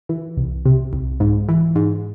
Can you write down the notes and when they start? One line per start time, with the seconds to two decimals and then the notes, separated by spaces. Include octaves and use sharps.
0.09 E3
0.37 C2
0.65 C3
0.93 C2
1.20 G#2
1.49 E3
1.75 G#2